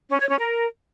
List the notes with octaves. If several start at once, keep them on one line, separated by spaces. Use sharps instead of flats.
C#4
C#5
C#4
A#4